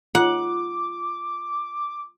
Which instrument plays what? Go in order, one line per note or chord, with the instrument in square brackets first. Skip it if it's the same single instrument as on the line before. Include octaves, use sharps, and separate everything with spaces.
[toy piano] F4 [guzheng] F#5 [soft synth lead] D6